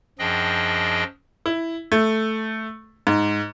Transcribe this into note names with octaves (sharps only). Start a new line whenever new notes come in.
F#2 F3 D4 G#4 D#5 G5
E4
A3
G#2